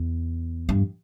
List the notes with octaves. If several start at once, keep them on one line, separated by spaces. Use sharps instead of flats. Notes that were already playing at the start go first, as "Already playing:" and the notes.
Already playing: E2
G2